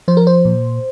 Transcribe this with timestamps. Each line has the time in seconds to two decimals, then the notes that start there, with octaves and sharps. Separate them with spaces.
0.08 F3 C5
0.17 A#4
0.27 C5
0.45 A#2